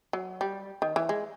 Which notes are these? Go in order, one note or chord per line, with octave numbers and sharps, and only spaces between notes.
F#3
G3
D#3
E3
G#3